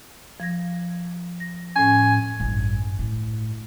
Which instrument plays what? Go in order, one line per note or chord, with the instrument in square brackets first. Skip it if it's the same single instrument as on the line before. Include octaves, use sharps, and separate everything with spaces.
[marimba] F3 G#6 A#6
A#6
[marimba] A2 C#4 [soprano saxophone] G#5
[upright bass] A1 G2
A2